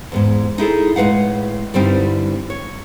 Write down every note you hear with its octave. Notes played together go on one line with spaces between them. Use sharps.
E2 G#2 G#3
D#4 E4 G#4 A4
A2 G#3 B4 F5 F#5
G2 D3 G3 C4 D#4 E4
C#5